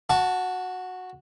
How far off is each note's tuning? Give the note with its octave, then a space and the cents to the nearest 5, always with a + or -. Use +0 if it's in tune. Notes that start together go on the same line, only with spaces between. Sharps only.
F#4 -10 A5 +5 C#6 +25